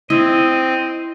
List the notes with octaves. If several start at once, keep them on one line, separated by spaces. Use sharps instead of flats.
C4 E4 D#5